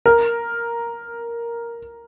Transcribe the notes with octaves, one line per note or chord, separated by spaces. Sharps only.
A#4